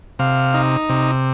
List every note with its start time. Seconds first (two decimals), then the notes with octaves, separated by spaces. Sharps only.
0.19 C3 F5
0.54 D#4
0.89 C3